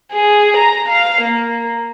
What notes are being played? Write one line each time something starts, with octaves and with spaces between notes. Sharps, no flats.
G#4
A#5
F5
A#3